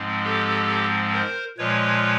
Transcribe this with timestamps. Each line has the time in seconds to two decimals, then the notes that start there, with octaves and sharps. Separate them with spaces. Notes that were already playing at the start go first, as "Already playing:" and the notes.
Already playing: G#2 F3 G#3 C4
0.23 G4 A4
1.13 A#4 C5
1.58 A#2 F3 G#3 B4 C#5